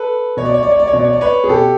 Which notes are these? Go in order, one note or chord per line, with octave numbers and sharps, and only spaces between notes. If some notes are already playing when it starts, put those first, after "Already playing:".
Already playing: A4 B4
B2 C#5
D5
C#5
D5
C#5
D5
C#5
B2 D5
C#5
D5
B4 C#5
G#4
B2 G4 A4